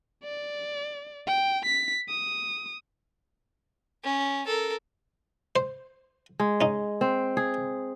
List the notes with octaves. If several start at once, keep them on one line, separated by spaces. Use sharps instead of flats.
D5
G5
B6
D#6
C#4
A4 A#4
C5
G#3
C#4 D#4
C4
G#4